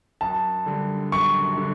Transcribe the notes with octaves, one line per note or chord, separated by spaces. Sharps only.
F#2 A5
D3 G3 D4
F#2 C#6
D3 G3 D4